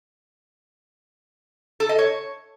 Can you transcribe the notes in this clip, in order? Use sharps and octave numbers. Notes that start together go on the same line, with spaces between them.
A4
D#5
C#5